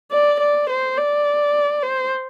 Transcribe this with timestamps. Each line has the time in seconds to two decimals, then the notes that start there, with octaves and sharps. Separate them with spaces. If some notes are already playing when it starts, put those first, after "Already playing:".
0.12 D5
0.40 D5
0.70 C5
0.98 D5
1.83 C5